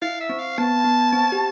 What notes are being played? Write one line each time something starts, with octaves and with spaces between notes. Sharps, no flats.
E4 F5
E5
C4
F5
B3 A5
B3
C4
G4